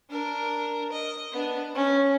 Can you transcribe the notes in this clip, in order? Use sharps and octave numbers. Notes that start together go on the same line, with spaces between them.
D4 A#4
D#5
B3 D4
C#4